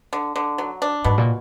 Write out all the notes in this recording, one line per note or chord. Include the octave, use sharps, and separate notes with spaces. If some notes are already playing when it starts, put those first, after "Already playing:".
D3
D3
F#3
D4
G#2 B2
A#2